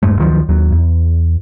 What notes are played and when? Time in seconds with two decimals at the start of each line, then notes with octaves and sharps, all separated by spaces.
0.03 D#1 G2 G#3 A3
0.19 D2 D#3 F3 F#3
0.49 D#2 F#3
0.72 E2